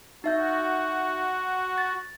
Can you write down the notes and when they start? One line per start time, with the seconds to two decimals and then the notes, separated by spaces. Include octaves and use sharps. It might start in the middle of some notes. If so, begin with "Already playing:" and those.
0.24 D#4 F#4 E5 G6
1.78 A6